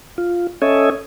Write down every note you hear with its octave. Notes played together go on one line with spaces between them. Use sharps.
F4
C#4 A4 C#5 D#5 E5 G#5